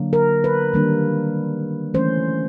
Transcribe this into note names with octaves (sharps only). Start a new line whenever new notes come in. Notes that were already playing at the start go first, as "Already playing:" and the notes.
Already playing: D3 F#3 A#3 D4
A#4
B4
D#3 G3 A#3 D4
E3 A3 C#4 C5